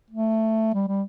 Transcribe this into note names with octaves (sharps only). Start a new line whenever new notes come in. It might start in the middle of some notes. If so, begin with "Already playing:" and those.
A3
G3
G3